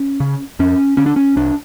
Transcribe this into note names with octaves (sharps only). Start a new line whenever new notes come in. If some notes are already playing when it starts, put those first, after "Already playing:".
Already playing: C#4
C#3
F2 C#4
D3 C#4
D4
C#4
C2 D4